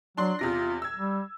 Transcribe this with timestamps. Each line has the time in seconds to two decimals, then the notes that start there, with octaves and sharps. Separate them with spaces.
0.17 F#3 D4 C6
0.39 E2 C3 F4 A#6
0.82 E6 G#6
0.95 G3